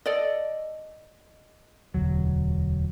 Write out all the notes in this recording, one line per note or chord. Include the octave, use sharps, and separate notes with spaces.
A4 D5 D#5
E1 D2 F#3